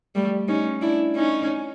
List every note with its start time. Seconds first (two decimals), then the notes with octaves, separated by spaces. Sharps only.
0.15 G3 A3
0.48 C#4 D#4
0.81 D4 E4
1.16 C#4 D#4